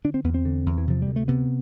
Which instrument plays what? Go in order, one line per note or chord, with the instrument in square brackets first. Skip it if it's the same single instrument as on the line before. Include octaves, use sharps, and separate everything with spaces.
[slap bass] D3 D4
C4
E2 B3
C4
D3
E2
E3
C3 F3
D2 G3
A3
C3 B3